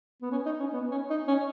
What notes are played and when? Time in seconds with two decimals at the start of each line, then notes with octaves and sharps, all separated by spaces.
0.22 B3
0.32 C#4
0.46 D#4
0.60 C#4
0.73 B3
0.91 C#4
1.10 D#4
1.28 C#4